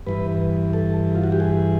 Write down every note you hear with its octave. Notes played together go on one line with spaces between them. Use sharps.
G2 E3 B4
A4
F4
F#4
G4
G#4